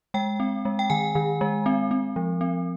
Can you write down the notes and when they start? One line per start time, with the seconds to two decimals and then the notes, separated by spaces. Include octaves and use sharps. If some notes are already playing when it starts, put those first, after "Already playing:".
0.14 G#3 G5
0.40 C4
0.65 G#3
0.79 G5
0.90 D#3 G#5
1.15 D#3
1.41 G#3
1.66 C4
1.91 C4
2.16 F3
2.41 C4